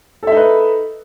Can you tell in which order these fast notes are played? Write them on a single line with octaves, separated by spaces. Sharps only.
A4 E5 D#4 B4